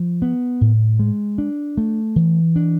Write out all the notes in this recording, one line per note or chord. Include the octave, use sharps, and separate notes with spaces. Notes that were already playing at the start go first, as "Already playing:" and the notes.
Already playing: F3
B3
A2
G#3
D4
A3
E3
D4